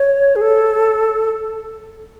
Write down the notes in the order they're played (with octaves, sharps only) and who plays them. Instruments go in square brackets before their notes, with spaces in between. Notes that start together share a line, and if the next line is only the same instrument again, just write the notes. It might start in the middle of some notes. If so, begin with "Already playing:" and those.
Already playing: [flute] C#5
G#4
A4